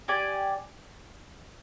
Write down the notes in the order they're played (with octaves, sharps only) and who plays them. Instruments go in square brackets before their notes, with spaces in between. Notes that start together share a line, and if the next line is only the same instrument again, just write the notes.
[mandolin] G4 D5 G#5